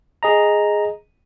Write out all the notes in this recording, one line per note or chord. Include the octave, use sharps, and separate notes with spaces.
G#4 D#5 A#5